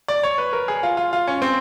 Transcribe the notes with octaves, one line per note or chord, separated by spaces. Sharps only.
D5
C#5
B4
A#4
G#4
F4
F4
F4
C#4
C4